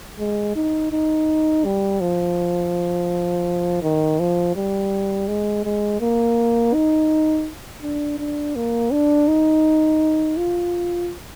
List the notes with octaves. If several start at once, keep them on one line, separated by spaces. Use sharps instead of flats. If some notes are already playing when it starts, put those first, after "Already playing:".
G#3
D#4
D#4
G3
F3
D#3
F3
G3
G#3
G#3
A#3
D#4
D4
D4
A#3
D4
D#4
F4